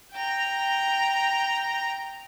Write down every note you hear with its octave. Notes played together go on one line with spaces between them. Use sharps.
G5 A#5